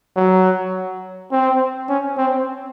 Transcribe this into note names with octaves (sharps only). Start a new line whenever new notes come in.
F#3
C4
C#4
C4